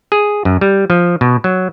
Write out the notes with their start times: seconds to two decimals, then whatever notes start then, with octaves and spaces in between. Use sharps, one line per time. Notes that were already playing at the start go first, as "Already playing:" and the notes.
0.12 G#4
0.45 F#2
0.61 G3
0.90 F3
1.21 B2
1.44 F#3